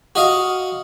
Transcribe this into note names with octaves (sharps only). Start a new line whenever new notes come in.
F#4 D#5 F5